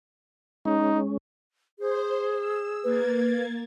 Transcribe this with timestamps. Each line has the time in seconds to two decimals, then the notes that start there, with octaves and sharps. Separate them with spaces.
0.65 G#3 C#4 D#4
1.79 G#4 C5
2.34 E6
2.84 A#3 B4 G#6 A6